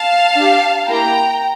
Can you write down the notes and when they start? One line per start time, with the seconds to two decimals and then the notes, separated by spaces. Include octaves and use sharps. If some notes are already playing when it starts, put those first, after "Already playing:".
Already playing: F5 A5
0.36 D4 G4
0.88 A#3 E4 G4 G5 A#5